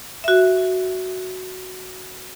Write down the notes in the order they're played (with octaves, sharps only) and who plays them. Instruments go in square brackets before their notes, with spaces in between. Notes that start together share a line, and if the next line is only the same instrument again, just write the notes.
[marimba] F#4 E5